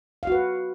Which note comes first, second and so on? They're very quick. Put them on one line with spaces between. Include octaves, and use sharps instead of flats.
F5 F#4 B4